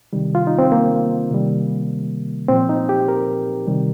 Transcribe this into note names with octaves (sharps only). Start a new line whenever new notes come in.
C3 D#3 G3
F4
D#4
C4
A#3
C3 D#3 G3
A#2 F3 C4
D#4
G4
A#4
C3 D#3 G3